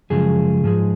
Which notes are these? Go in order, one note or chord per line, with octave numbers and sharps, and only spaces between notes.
F#2 C#3 F3 G#3 G#4
G#2 F3 G#3